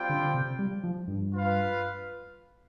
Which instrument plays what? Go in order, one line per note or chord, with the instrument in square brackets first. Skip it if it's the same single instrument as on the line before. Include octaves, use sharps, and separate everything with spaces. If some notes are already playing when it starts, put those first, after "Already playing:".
Already playing: [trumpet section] G3 C4 F4 C5 G5
[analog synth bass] D3
C3
G3
F3
G2
[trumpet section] F4 B4 F5